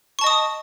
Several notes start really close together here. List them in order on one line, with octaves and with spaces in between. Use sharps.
C#6 A5 D#5 D#6